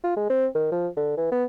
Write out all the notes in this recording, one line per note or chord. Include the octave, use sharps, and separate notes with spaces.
F4
G#3
C4
D#3
F3
D3
E3
B3